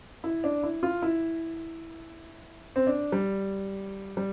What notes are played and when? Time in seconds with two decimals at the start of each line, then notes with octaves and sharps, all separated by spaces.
0.24 E4
0.44 D4
0.63 E4
0.83 F4
1.02 E4
2.76 C4
2.87 D4
3.12 G3
4.17 G3